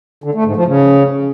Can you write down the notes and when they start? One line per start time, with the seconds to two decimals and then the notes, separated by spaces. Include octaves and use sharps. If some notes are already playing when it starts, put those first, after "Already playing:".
0.24 D3
0.35 A3
0.45 G#2
0.56 F3
0.67 C#3